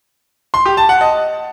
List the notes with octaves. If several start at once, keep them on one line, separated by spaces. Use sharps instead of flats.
C6
G4
A5
F#5
D#5